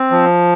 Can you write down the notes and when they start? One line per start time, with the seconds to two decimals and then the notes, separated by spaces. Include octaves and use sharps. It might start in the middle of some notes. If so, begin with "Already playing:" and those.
Already playing: C4
0.11 F3